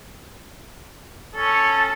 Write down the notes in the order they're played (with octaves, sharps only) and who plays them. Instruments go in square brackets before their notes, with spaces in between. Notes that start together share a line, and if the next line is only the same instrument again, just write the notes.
[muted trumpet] C#4 [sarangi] A4